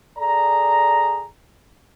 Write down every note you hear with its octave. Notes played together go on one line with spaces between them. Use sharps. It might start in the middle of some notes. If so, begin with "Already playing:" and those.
G#4 A4 D5 A#5